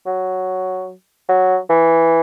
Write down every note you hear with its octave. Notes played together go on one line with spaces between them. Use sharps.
F#3
F#3
E3